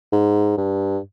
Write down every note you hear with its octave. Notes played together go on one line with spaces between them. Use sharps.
G#2
G2